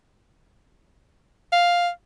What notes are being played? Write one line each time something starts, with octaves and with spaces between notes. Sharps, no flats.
F5